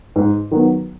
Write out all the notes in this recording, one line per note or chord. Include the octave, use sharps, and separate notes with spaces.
G#2
D#3 F#3 B3